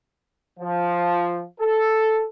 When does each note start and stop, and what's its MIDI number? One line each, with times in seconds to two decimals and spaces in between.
0.59 1.43 53
1.60 2.26 69